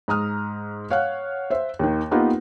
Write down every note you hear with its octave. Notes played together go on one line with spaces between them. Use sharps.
G#2 A#5 D#6 F6
C#5 F5 F#5 F#6
C5 E5
D#2 D#3
A#3 B3 D#4 F4 G4 B4